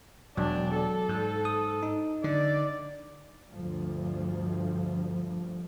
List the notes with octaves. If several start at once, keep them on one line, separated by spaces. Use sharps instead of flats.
E1 F#3 D4
A4
G#2
D#6
D#4
D3 D5
D2 G2 F3